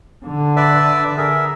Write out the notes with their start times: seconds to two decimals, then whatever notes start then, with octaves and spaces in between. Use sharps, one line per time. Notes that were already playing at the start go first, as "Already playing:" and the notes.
0.25 D3
0.56 B4 D5 E5
1.18 G#4 A#4 E5